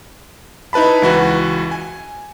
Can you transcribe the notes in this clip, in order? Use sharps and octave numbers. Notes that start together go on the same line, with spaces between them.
D#4 E4 B4 A5 B5
C#2 E3 F#4 B4
G#5